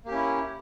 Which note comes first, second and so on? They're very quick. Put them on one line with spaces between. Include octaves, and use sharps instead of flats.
A#3 G4 C#4 E4